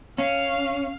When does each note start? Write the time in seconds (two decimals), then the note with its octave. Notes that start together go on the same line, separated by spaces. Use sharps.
0.18 C#4 F5